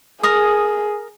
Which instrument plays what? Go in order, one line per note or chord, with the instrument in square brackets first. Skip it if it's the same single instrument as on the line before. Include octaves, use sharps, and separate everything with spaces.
[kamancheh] G#4 [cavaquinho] A#4 D#6